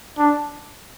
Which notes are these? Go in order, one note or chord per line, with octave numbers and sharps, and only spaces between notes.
D4